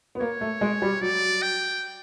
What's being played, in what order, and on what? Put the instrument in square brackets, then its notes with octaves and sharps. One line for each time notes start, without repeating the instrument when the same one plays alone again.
[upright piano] B3
[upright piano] A#3 [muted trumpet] C#5
[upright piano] A3
G#3
G3
[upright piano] F#3 [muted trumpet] D5
[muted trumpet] G5